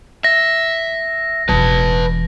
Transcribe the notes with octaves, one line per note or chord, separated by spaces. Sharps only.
E5 A#6
E1 E3 B4 A5